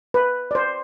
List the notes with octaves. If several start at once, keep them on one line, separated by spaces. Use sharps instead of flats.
B4
D5
C5